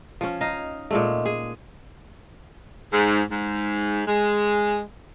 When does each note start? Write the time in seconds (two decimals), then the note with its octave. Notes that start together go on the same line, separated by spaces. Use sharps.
0.21 F3 C#4
0.41 D#4 D#5 F5
0.91 A#2 G#3 A3
1.25 G#4
2.93 G#2
3.31 G#2
4.07 G#3